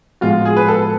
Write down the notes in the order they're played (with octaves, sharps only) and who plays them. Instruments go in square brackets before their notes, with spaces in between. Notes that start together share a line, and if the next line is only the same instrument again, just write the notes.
[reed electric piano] A2 F3 G#3 B3 F#4 [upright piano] F4
[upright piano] G#4
B4
A4